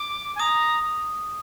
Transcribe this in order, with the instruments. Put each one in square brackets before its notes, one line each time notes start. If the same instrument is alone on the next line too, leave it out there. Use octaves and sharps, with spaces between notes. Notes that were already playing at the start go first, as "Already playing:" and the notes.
Already playing: [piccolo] D6
G#5
[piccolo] A#5 [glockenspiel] D#6